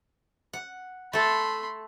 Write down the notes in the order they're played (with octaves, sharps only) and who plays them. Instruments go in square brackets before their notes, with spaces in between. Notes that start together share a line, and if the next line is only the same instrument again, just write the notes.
[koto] F#5
[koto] A3 A4 [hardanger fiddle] B5 C6